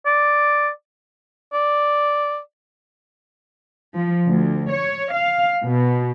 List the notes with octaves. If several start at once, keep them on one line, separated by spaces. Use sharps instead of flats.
D5
D5
F3
D2
C#5
F5
B2